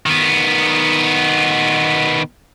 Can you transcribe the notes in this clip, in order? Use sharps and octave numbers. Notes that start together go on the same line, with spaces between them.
D#3 B3